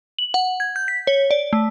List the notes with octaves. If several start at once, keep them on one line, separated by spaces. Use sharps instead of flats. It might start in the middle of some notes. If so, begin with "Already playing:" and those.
F#7
F#5
G#6
G6
B6
C#5
D5
A3